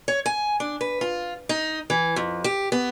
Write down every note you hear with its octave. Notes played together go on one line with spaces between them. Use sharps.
C#5
G#5
D4
B4
F4
D#4
E3
F2
G4
B3